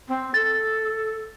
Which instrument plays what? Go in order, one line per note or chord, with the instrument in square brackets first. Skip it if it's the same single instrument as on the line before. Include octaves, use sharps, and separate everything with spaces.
[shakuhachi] C4
[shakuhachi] A4 [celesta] A6